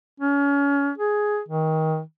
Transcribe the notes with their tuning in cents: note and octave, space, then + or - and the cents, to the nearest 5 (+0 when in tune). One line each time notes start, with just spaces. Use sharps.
C#4 +30
G#4 +5
D#3 +25